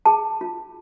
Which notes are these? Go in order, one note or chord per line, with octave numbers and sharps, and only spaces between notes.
G#4 A5
F4